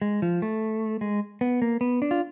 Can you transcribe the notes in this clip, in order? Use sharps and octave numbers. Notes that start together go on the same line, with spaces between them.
G#3
F3
A3
G#3
B3
A#3
B3
D4
F4